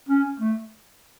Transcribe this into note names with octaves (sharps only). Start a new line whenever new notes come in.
C#4
A3